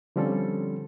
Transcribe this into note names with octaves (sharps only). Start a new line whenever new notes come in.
D3 F3 G3 C4 C#4 A4